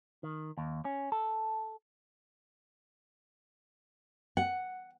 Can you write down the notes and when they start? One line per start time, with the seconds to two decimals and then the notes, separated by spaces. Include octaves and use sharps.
0.23 D#3
0.58 D#2
0.85 C#4
1.12 A4
4.37 F#5